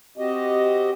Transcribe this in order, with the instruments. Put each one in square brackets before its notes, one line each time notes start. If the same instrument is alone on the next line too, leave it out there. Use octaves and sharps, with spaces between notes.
[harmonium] C4 F#4 G4 D#5